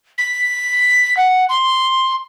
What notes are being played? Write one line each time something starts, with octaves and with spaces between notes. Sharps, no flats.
B6
F#5
C6